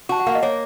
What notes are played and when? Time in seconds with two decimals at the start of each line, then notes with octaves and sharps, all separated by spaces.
0.09 F#4 A5
0.20 F#5
0.26 A#3 F5
0.35 D#5
0.42 A#3 C#5